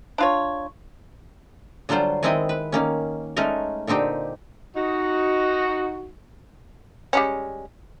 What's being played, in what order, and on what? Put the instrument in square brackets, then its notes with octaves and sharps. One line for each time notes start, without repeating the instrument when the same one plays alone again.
[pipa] D4 F4 C#5
[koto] D3 F#3 G3 F4 C5
D#3 G#3 C4 E4 D#5 G#5
B4
D#3 A#3 C#4
G#3 A3 C#4 D#4 A#4
A#2 D3 C4 D#4 G4
[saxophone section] D#4 F#4
[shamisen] G3 G#3 C#4